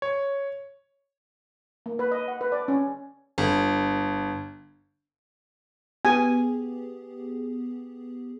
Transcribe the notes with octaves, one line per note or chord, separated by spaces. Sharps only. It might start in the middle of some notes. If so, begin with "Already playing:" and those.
C#5
A#3
B4
D#5
F#5
B4
D5
C#4
G1
B3 G4 G#4 G#5